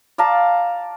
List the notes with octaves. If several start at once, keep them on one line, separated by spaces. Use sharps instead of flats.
D5 F5 A5 A#5